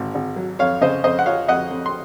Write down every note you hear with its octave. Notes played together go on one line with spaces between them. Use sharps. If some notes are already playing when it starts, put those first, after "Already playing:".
Already playing: G#1 G#2
G#1
F#3
F2 C#5 F5
C#3 C5 D#5
F2 C5 D#5
F#5
F3 C#5 F5
F2 D#5 F#5
F2
C6